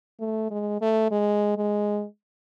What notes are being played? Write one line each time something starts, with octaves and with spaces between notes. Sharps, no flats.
A3
G#3
A3
G#3
G#3